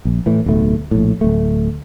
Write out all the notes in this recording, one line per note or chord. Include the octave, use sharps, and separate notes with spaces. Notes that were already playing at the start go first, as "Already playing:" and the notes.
A#1
A2 E3
D1 B1 A3
A#1 A2
D1 A3